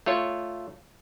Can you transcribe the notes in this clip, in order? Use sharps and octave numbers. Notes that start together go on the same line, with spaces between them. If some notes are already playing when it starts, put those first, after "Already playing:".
A3 F4 C#5